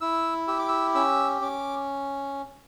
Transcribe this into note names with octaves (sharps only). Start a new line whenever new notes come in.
E4 E6
G4 E6
D6
E6
C#4 E6
C#4 D6